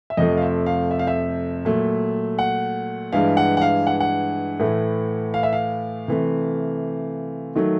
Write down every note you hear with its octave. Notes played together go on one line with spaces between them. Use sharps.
E5
F2 C3 F3 A3 D#5
F5
E5
F5
E5
F5
E5
A#2 F#3 A3
F#5
G2 E3 G#3 F5
F#5
F#5
F5
F#5
F#5
A2 E3 A3
F5
E5
F5
C3 E3 A3
D#3 F#3 A3